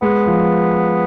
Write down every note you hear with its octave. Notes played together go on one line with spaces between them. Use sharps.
G#3 B3
F3